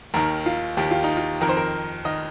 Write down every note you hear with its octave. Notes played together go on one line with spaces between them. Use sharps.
D#2 D#3 A#4
F4
D#2 D#3 G4
F4
D#4
F4
F2 D#3 A#4
C5
A#4
D#3 D#5